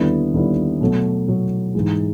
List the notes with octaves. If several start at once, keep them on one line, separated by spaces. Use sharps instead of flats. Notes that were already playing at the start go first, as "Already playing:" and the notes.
Already playing: D#2 D3 G3 B3 E4
D#2 D3 G3 B3 E4
B2 F#3 A3
B2 F#3 A3
G#2 E3 G#3